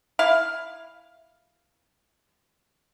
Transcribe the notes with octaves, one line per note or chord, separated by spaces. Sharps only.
E4 F5